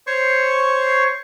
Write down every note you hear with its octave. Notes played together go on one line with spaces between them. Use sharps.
C5 C#5 C#6